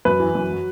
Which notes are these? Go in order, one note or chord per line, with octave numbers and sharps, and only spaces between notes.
F#2 B4
E3
F#2
F#3